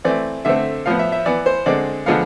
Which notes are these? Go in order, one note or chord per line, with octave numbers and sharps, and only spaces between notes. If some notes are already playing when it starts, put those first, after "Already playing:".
E3 A3 C4 D5
D3 A3 C4 E5
A2 F3 B3 F5
E5
E5
E3 B3 D5
C5
D3 G#3 C4 D5
D3 F3 G#3 B3 F5